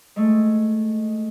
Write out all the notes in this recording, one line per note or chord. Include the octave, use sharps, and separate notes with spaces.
G#3 A3